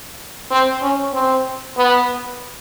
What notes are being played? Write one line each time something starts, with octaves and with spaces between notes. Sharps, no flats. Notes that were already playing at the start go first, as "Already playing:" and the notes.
C4
C#4
C4
B3